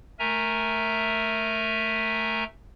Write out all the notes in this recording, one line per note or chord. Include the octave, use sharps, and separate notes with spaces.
A3 A#4 E5 G#5 A#5